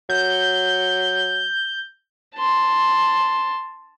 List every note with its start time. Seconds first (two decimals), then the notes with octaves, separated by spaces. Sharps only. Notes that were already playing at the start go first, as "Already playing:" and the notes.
0.09 F#3 G6
2.36 A5 C6